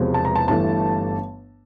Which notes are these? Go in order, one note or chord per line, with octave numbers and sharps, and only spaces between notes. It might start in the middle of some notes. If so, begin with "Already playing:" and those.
Already playing: E1 E2 C3 F3 G#3
A5
A#5
A5
G1 G2 E3 A3 A5